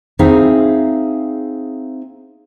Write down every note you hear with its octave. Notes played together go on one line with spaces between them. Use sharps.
C4 D#4 G#4 E5 F5